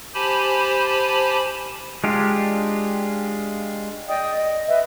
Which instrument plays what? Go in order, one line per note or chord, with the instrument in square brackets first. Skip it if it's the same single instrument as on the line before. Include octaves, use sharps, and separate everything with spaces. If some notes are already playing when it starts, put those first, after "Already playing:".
[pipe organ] G4 C5 G#5 A5 B5
[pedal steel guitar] G#3 D4 F4 G4
[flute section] D5 D#5 G5 D#6
D#5
B4 D#5 E5